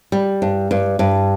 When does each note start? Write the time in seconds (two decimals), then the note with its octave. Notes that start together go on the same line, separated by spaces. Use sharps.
0.12 G3
0.42 G2
0.71 G2
0.99 G2